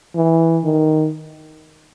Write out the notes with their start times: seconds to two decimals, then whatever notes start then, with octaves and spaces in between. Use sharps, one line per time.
0.15 E3
0.64 D#3